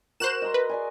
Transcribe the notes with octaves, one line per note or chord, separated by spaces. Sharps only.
F#4 A#4 C5 F#6 E7
D#5 A#5 C6
B4
G#4 D5 G#5